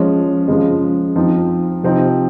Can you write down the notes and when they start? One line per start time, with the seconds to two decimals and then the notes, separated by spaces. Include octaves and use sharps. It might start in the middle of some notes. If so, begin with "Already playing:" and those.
Already playing: F3 G#3 C#4
0.48 C#3 F3 G#3
1.16 F3 C4 D#4
1.84 C3 F3 C4 D#4